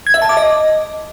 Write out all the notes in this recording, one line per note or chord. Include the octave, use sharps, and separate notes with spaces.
G#6
E5
A5
D6
D#5